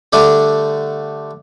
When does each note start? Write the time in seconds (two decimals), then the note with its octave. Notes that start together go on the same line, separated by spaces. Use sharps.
0.13 D3 G3 A3 D4 A4